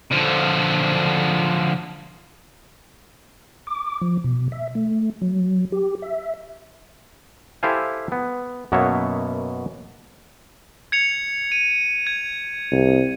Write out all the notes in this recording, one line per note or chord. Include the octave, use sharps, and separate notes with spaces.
D3 F3
D6
F3
B2
E5
A3
F#3
G4
E5
E4 G4 A4 C5 F5 G#5
B3
F#2 B2 A#3 B3 C#5 E5
G#6 C#7 F7
D#7
G#6
C2